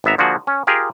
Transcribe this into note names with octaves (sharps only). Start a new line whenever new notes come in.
G#1 B3 E5 A#5
D3 F3 A#3 F#4 G#4
C#4
F4 G4 G#4 A#4